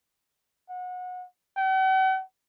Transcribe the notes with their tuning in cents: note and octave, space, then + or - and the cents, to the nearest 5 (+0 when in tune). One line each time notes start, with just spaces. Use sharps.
F#5 -25
F#5 +45